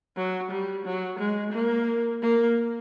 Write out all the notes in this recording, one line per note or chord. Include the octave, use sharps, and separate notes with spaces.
F#3
G3
F#3
G#3
A#3
A#3